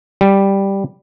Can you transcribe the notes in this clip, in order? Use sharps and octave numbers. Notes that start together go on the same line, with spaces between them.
G3